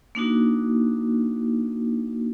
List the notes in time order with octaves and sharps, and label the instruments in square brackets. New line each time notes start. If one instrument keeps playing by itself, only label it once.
[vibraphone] A#3 D4 D#4 F#4